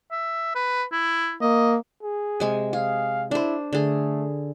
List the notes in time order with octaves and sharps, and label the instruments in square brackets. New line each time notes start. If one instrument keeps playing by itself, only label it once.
[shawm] E5
B4
E4
[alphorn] A#3 [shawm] D#5
[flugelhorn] G#4
[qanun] C3 G#3 G#5
[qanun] G#4 [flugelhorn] F5
[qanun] D4 C5 [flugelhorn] E4
[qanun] D3 G#4 [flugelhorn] A3